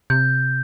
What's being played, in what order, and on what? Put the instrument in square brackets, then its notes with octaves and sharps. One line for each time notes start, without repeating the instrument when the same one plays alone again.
[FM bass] C3 [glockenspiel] G6